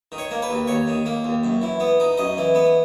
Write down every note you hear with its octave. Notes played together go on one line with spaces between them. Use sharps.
D#3
C#5
A#3
B4
D#2
D#2 C#5
D#3
A#3
D#2
F#2
E3
B3
D#4
F#2 D#5
E3
B3